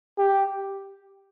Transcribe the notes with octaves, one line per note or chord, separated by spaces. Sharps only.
G4